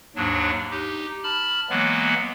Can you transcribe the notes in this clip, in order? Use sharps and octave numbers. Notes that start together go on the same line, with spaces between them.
D#2 G#2 F#3 D4
D#4 G4
A5 B5 F6
E3 F#3 G#3 A#3 B3